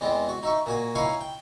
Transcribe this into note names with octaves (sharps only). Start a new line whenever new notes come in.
E2 G#3 B3 C4
F#4
D#4 E5 C#6
A#2 F#4 G#5
D#4 E4 C#5 F5 G#5 C#6
G5